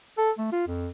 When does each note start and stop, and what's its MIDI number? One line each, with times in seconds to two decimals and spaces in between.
0.18 0.31 69
0.38 0.48 57
0.52 0.65 65
0.67 0.89 41